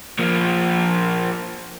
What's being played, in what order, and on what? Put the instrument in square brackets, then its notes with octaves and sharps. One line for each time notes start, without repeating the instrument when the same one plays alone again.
[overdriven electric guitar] F3 A#3